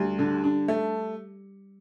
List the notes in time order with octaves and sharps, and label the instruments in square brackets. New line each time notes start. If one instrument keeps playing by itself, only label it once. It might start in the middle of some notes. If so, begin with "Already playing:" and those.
Already playing: [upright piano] D2 [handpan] G3
[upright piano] D3
D4
A3